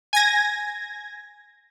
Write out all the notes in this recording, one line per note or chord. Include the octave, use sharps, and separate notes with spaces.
G#5 G#6 A#6